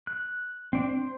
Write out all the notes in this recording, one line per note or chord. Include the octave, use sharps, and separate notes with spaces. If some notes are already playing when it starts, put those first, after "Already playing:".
F#6
C4 D4
C5